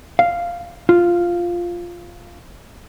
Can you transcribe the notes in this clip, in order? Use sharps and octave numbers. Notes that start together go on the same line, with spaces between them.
F5
F4